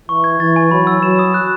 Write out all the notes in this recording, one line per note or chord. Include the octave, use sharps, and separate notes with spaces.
E3 C#6
G#6
E3 A6
G#5
F#3 B5
E6
F#3 E7
D#6
F#6